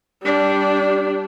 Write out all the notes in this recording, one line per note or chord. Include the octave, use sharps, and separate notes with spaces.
G3 D4